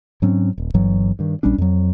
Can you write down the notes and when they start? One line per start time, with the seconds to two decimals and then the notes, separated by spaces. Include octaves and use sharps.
0.22 G#2 F#3 C4 C#4
0.58 D#1
0.74 G1 G2 E3 F#3
1.19 G2 D#3
1.43 A#1 G3 C#4 D4
1.58 F2 F#3